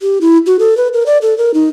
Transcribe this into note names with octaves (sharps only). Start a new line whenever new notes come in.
G4
E4
F#4
A4
B4
A#4
D5
A4
A#4
D#4